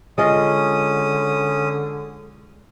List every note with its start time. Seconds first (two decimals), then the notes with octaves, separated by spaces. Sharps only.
0.18 D3 G#3 C#4 F4 D#5 D#6